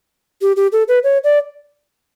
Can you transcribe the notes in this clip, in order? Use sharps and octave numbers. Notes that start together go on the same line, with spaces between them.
G4
G4
A4
B4
C#5
D5